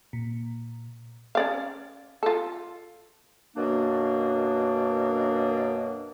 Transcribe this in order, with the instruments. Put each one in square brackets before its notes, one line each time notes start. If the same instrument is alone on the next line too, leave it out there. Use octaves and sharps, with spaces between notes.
[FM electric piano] A#2
[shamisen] C#4 D5 F5
F4 A4
[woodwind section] F#2 B2 A#3 D4